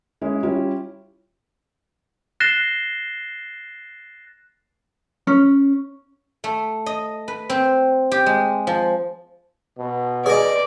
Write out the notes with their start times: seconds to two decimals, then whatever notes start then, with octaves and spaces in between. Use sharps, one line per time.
0.21 G#3 C#4 E4
0.43 G3 C#4 E4 F4
2.40 F#6 A6 A#6 C7 E7 G7
5.27 C#4
6.44 A3
6.86 D#5
7.28 B4
7.50 C4
8.12 G4
8.26 G#3
8.67 F3
9.78 B2
10.26 G#4 B4 D5 D#5